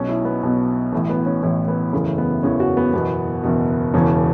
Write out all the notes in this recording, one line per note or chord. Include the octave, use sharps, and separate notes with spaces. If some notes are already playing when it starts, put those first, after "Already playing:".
Already playing: B1 B2 C#4
E4
B3
B1 B2
A1 A2 E3
B3
C#4
A1 A2 E3 E4
B3
F#1 E2 C#3 E3 A3
B3
F#1 E2 C#3 E3 C#4
F#4
B3
F#1 E2 B2 B3
F#1 E2 B2
E1 E2 C#3 E3 C#4